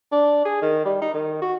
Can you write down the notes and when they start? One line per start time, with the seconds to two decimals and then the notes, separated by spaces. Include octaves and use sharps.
0.12 D4
0.45 G#4
0.62 D#3
0.85 G3
1.02 D#4
1.14 D#3
1.42 F#4